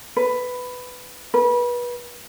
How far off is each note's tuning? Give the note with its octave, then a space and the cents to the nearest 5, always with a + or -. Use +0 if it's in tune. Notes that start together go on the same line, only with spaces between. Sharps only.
B4 +10
B4 -30